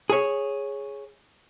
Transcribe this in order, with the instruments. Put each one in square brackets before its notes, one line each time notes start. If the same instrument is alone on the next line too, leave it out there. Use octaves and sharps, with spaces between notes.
[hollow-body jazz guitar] G#4 C#5